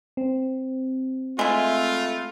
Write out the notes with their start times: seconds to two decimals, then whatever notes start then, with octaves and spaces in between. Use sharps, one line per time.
0.17 C4
1.39 G#3 A3 E4 F4